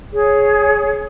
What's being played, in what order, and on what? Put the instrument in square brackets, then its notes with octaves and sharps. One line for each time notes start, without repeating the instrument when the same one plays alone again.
[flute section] G#4 C#5